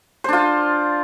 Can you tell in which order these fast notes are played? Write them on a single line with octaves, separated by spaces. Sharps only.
C5 D4 F4